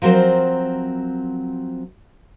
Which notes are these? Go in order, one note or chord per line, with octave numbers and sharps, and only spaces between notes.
F3 F#3 C4 A#4 C5